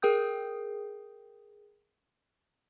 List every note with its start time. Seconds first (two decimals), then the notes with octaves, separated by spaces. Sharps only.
0.02 G#4 A#4 G5 D#6 G6